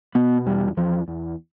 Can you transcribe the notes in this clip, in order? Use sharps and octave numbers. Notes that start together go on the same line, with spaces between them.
B2 B3
E2 G3
E2 F3
E2